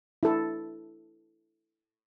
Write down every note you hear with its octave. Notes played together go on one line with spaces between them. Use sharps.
E4 A4